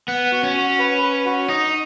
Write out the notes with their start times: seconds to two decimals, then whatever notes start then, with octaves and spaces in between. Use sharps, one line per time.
0.08 B3 F#5
0.32 F#4
0.44 C#4
0.56 F#4
0.79 B4
1.02 B4
1.25 F#4
1.49 D#4 D#5